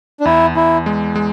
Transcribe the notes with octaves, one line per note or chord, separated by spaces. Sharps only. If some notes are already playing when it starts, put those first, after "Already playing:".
D4
E2 E4
E2 E4
G#3
G#3